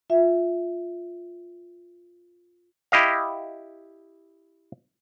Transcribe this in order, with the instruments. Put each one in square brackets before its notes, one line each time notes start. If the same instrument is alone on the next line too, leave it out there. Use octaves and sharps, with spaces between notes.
[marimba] F4 E5
[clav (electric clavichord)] E4 G4 D#5 F5